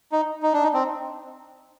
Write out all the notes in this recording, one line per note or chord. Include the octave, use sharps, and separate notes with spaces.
D#4
D#4
D4
D#4
C4